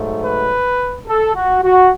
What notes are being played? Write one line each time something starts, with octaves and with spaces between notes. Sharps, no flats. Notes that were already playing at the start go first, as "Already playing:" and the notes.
Already playing: G#2 F#3 A3
B4
A4
F#4
F#4